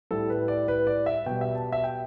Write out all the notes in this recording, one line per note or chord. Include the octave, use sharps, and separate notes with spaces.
A2 G3 A4
B4
D5
B4
D5
E5
B2 G3 G5
E5
A5
E5
G5